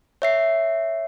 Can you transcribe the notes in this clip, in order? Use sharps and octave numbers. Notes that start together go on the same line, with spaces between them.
C#5 E5 C7